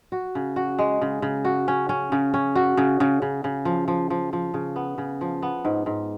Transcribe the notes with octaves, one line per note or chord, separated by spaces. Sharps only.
F#4
C#3
F#4
G#3
C#3
C#3
F#4
C#4
C#4
C#3
C#4
F#4
C#3
C#3
C#3
C#3
F3
F3
F3
F3
C#3
B3
C#3
F3
B3
G#2
G#2